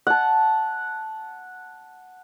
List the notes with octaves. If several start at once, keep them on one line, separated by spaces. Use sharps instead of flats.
F#5 A5